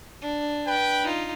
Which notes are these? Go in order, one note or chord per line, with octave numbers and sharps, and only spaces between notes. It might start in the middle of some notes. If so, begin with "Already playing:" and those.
D4
B4 G5
D#4 F4